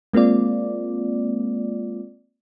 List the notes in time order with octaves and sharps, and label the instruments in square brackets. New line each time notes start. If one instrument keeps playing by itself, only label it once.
[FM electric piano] G#3 A#3 C4 F4 D5